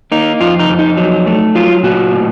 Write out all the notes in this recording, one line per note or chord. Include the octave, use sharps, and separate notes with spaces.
A#3 D#4
F2 F4
D#4
F2
D#4
F#3
A3
F#3 F4
A#2 F#4
A2